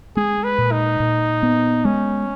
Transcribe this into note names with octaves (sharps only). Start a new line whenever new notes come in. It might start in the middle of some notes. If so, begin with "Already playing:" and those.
G#3 G#4
B4
A#2
D#4
A#2
B3
G#3 C#4